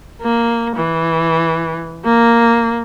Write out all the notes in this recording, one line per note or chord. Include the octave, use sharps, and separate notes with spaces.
A#3
E3
A#3